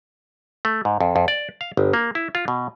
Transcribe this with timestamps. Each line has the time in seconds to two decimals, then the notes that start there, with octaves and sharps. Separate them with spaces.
0.65 A3
0.85 G#2
1.01 F2
1.16 F2
1.28 D5
1.61 F5
1.77 G1
1.93 A#3
2.15 E4
2.35 F4
2.48 B2